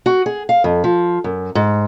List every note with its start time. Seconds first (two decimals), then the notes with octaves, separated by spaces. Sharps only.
0.06 F#4
0.26 G#4
0.49 F5
0.64 F2
0.84 F3
1.24 F#2
1.55 G#2